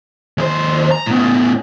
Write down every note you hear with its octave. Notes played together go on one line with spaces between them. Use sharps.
D#2 C5
A#5
A2 B3